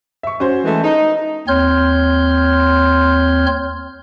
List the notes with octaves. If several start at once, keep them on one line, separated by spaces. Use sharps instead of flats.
E5 C#6
C#4 F#4 C5
E3 G#3 A3
D#4
D#2 C4 C#5 C6 F6 G6